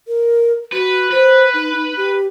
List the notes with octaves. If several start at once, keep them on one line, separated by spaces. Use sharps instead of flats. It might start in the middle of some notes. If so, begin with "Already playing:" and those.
A#4
F#4 B4
B4 C5
D#4
D#4
G4